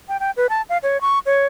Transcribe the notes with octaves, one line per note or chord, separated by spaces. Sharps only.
G5
G5
B4
A5
F5
C#5
C#6
C#5